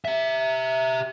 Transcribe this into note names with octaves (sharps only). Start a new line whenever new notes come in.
G4 E5